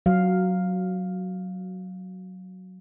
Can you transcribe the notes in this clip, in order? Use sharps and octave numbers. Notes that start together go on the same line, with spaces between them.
F#3 F5